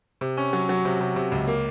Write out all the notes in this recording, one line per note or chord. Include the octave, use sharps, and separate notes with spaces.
C3
C#4
F#3
F#3
C3
C3
C3
C#2
A#3